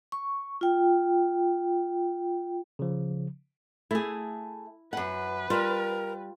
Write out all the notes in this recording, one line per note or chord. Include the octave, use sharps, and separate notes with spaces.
C#6
F4 G5
C#3 F3
A3 E4 G#4
F#2 B4 F#5
G3 F4 A#4